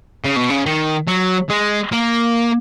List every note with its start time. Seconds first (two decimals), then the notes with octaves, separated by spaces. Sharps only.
0.24 C#3
0.36 B2
0.50 C#3
0.66 D#3
1.08 F#3
1.50 G#3
1.92 A#3